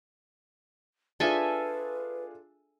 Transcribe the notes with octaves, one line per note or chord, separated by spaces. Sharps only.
D4 F4 G#4 A4 B4 E5 G#5